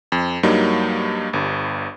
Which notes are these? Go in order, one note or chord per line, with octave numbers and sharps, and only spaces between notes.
F2
G2 F#3 G3 A#3 D#4
G1 G2